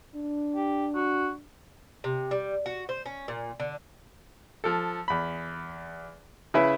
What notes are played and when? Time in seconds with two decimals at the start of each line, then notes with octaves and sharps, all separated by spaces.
0.15 D4
0.55 G4
0.95 F#4
2.04 C3
2.31 G3
2.66 F#4
2.89 C5
3.06 C#4
3.28 A#2
3.60 D3
4.64 F3 A4
5.08 E2 B5
6.54 C#3 E4 B4